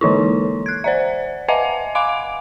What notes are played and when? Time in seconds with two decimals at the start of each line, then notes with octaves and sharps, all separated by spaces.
0.01 D3 E3 D#4 E4
0.66 F#6 G#6
0.84 C5 D5 E5
1.48 B4 D#5 E5 F#5 G#5
1.95 F5 G#5 C6 D6 D7